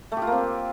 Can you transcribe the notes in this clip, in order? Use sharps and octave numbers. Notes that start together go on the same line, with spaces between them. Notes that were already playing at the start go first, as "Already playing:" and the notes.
A3
G4
F4
A#3
C4